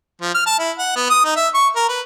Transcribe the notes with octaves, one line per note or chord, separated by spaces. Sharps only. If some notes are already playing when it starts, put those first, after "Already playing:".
F3
F6
A5
E4
F#5
B3
D#6
D#4
E5
C#6
A#4
B4